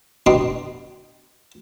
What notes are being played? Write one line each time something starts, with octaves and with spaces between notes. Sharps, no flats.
B2 D3 D#4 G4 B4 C6